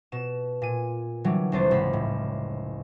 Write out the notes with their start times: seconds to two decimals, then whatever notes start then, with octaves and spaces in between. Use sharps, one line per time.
0.12 B2 E7
0.62 A#2 D#7
1.24 D3 E3 F#3 G3
1.52 F1 C2 C5 A6
1.71 C#2 G#2 C#3 B5
1.93 A2